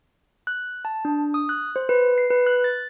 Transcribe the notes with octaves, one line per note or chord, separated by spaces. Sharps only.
F#6
A5
D4
D#6
F#6
C5
B4
C7
B4
F#6
A6